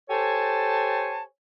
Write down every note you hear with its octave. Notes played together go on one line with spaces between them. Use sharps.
G4 A4 C5 C#5 G#5 A5